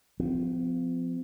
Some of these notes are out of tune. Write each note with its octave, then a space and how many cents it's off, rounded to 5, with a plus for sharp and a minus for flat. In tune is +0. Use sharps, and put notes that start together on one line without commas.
F3 +0 C4 -45